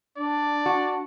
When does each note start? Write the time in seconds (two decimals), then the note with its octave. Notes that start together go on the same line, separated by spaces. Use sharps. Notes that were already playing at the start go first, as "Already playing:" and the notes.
0.17 D4 D5
0.66 F#4